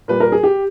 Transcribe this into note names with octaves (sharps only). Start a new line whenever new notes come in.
A#2 G3 B4
A#4
G#4
G4